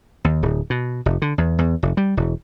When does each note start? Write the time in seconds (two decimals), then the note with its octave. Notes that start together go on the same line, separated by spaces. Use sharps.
0.24 D#2
0.42 D1
0.70 B2
1.06 F1
1.22 D3
1.38 E2
1.58 E2
1.83 F1
1.97 G3
2.17 E1